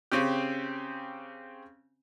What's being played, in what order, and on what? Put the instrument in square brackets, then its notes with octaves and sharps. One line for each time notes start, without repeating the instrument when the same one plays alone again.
[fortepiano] C#3 C4 C#4 G4